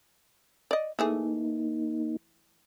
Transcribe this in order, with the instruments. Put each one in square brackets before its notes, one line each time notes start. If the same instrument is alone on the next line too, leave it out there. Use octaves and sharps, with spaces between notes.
[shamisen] D5 D#5
[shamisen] E3 A3 G#4 [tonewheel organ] A#3 D#4